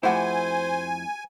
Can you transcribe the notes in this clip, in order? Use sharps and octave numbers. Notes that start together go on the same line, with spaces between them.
F2 A3 E4 F#4 G4 C5 F#5 G#5